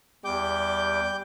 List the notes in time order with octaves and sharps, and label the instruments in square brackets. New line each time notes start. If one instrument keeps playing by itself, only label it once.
[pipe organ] E2 [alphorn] G3 [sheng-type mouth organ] G5 D6 G6